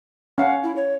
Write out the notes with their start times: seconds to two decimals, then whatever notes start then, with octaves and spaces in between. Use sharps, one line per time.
0.38 C#4 F5 F#5
0.63 E4
0.76 C#5